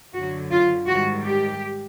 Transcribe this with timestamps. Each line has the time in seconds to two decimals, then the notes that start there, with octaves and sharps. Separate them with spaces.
0.14 F#2 D3 F#3 F#4
0.51 F4
0.87 G#2 D#3 G3 F#4
1.24 G4